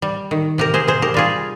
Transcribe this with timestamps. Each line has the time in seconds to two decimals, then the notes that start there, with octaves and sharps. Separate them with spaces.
0.02 G3
0.31 D#3
0.58 C3 G4 A#4
0.74 G#4 C5
0.88 C3 G#4 C5
1.02 G4 A#4
1.14 G3 F4 G#4